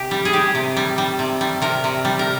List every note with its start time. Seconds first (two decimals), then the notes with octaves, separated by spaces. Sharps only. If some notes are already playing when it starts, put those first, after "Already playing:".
Already playing: C3 G4
0.11 G3
0.25 G#4
0.33 G3 G4
0.55 C3
0.77 G3
0.98 G3
1.19 C3
1.41 G3
1.62 C3 A#4
1.84 C3
2.05 G3
2.19 A#4